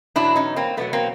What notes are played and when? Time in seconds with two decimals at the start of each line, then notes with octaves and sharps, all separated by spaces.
0.16 E2 B2 F#3 D4 E4
0.36 C#4 D#4
0.56 A#3 C4
0.77 E2 B2 F#3 A3 B3
0.93 A#3 C4